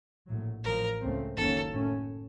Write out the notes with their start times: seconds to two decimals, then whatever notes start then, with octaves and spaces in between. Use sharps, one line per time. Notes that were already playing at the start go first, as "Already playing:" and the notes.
0.27 A#1 A2 F#3
0.64 A1 A2 F3 A#4
1.01 C#2 C#3 A3 C4
1.37 F#1 F#2 D#3 A#3 C#4 A4
1.73 A2 A3 C#4